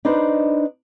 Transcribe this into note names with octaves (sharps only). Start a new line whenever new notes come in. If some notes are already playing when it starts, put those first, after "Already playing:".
D4 D#4 B4 C5 D#5